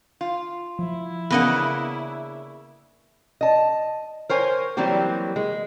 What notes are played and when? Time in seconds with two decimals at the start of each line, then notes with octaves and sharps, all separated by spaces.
0.21 F4
0.79 F3 E4
1.30 C#3 E3 A#3 B3 D4 B4 D#5 F#5
3.41 D#5 A5
4.29 A#4 C5 C#5 G#5
4.77 E3 F#3 G3 A#3 C4 G4
5.36 G#3